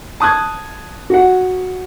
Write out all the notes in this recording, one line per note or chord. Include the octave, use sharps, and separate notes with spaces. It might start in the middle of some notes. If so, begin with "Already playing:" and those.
A5 D#6 F#6 G#6
F#4 F#5